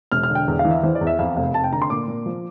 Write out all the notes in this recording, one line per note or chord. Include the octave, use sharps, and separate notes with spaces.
E1 F6
F6
D3
G5
E2
F5
E3
E5
E3 C5
D5
E2
E5
F2 F5
F1 F5
F1 A5
G5
D3 A#5
C6
A#2 D6
A#2
F3